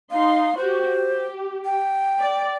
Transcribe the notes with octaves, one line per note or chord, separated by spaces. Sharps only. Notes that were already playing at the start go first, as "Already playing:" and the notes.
D#4 F5 C6
F#4 G4 C5
G4
G5
D5